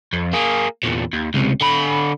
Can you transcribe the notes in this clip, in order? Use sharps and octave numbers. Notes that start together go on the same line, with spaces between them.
F2
A#3 G#4
E2 A#2
D#2
C#2 C3
D3 B5